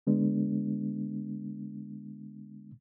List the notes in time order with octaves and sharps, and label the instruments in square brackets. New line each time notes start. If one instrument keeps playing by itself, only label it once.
[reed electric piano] D3 G#3 B3 D4